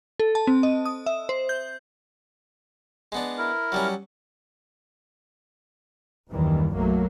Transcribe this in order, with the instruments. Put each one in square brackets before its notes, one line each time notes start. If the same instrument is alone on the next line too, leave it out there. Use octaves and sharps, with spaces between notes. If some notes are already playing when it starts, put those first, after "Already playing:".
[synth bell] A4
A5
C4
D#5
D#6
E5
C5
G6
[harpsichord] G#3 B3 D4
[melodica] E4 A#4
[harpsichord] F#3 G3 C#4
[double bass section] F#1 D#2 D#3 E3 G3
B1 F#3 A3 A#3